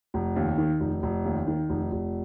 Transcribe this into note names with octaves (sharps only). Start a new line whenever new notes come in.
F1
D#2
D#3
F1
F1
D#2
D#3
F1
F1